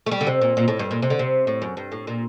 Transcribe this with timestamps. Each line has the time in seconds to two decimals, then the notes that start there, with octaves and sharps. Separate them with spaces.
0.06 A3
0.11 G3
0.21 D3
0.27 C3
0.41 A#2
0.57 A#2
0.68 A2
0.79 G2
0.91 A#2
1.02 C3
1.10 D3
1.19 C3
1.47 A2
1.62 F#2
1.77 G2
1.92 A2
2.07 A#2